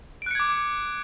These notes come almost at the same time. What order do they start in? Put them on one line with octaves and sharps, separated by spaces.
D7 F#6 C#7 G#6 D6